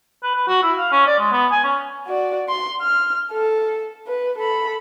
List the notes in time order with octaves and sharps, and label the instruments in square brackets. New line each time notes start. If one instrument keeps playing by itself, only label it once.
[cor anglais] B4
B4
F#4
E4
F5
C#4
D5
G#3
B3
G#5
C#4
[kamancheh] F#4 D5
C6
F6
A4
B4
A4 B5